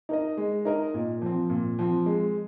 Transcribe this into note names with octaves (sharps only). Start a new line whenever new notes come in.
D#4 A#4 D#5
G#3
D#4 A#4 D#5
A#2
F3 C4
A#2
F3 C4
G#3